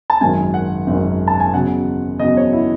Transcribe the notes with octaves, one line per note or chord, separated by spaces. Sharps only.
A5
G#1 F#2 D#3 F#3 G#5
F#5
G#1 F#2 D#3 F#3
A5
G#5
E2 C#3 F#3 F#5
E2 C#3 F#3 D#5
C#5
E4